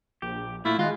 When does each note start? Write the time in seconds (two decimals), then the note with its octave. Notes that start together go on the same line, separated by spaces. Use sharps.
0.22 A#1 G4
0.65 A#2 A3 E4 F4
0.79 D#3 G#3 F4 F#4